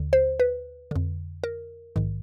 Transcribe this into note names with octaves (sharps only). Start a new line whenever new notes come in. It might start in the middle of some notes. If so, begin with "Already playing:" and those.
Already playing: D#2 D3
C5
B4
F2 D3
A#4
A#1 G#2 D#3